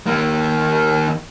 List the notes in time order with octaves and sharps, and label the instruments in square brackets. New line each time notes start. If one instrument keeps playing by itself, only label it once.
[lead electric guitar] D#3 A#3